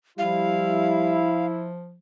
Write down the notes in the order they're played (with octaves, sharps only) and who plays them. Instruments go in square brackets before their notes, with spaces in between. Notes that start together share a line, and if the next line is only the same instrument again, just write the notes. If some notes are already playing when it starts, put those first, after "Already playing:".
[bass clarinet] F3 [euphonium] G3 [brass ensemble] E4 [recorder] F5